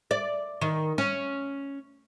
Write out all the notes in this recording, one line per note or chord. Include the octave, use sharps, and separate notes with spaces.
D5
D#3
C#4